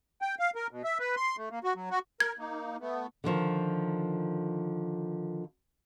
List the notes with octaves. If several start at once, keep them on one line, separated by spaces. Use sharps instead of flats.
G5
F5
A#4
B2
E5
B4
C6
A3
A#3
F#4
F#3
F#4
A#4 G#6
A#3 D#4
A3 B3
D3 D#3 F3 A#4